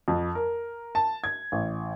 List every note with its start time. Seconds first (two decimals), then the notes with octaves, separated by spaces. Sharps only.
0.08 F2
0.35 A#4
0.95 A5
1.24 G#6
1.52 A1